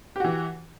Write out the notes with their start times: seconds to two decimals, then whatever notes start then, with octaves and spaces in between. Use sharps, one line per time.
0.16 G4
0.20 F#4
0.24 E3